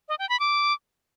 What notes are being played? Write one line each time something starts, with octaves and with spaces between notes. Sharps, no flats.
D#5
G5
B5
D6